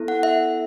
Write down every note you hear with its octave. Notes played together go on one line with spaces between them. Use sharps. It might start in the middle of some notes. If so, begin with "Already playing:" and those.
Already playing: B3 E4 A4
F#5
E5